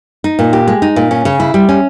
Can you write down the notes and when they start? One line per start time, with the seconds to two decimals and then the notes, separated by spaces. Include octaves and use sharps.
0.24 D#4
0.39 A#2
0.53 G4
0.68 G#3
0.82 D#4
0.96 A#2
1.11 C#4
1.25 C#3
1.40 E4
1.54 G3
1.69 C#4